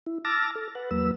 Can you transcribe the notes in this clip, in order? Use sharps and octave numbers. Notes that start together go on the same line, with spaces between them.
E4
A5 D6 E6 F6 A6 A#6
A4
B4 F#5
E2 F#3 A#3 B4 E6